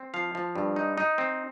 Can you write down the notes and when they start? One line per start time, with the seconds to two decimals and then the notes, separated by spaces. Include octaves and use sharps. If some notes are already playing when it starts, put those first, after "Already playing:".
Already playing: C4
0.14 F3 F5
0.35 F3
0.56 G2
0.76 D#4
0.98 D#4
1.18 C4